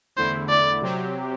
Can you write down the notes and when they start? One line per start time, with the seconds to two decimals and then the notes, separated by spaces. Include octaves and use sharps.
0.17 E2 D3 A3 E4 C5
0.49 D5
0.81 C3 F#3 C4 G4